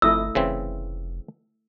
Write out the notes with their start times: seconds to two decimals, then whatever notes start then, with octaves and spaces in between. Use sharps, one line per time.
0.02 G1 F2 A3 E4 D#5 E6
0.35 F1 C#3 E3 C4